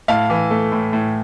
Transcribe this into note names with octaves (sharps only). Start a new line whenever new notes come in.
A2 F5 A5
E3
A3
A2
A2